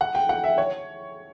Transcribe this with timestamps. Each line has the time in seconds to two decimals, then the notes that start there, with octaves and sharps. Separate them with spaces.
0.01 F#5
0.15 G5
0.29 F#5
0.44 E5
0.58 C#5